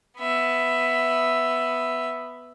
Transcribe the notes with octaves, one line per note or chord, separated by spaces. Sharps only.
B3 E5